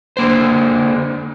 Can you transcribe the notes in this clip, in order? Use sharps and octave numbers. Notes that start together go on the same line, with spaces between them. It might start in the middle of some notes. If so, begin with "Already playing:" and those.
D3 A#3 C5